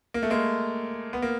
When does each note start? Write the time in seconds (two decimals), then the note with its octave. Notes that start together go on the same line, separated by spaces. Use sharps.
0.14 A#3
0.23 A3
0.30 G#3 A#3
1.13 B3
1.22 A#3